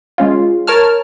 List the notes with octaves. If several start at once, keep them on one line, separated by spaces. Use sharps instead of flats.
G#3 C#4 F4
A#4 C#5 A5 F6